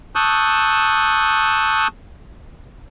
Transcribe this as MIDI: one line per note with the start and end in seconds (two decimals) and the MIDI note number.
0.15 1.87 81
0.15 1.87 85
0.15 1.87 87
0.15 1.87 88
0.15 1.87 90
0.15 1.87 91